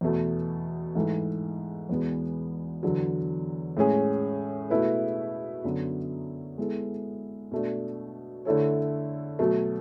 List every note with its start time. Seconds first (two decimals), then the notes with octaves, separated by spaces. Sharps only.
0.01 E2 B2 A3
0.95 G#2 E3 A3
1.89 E2 B2 G#3 B3
2.83 E2 D3 F#3
3.77 A2 G#3 C#4 G#4
4.70 B2 A3 E4 B4
5.64 F#2 D3 F#3 B3
6.58 G#3 B3 E4 A4
7.52 B2 A3 D4
8.45 D3 A3 E4 A4 C#5
9.39 B2 F#3 A3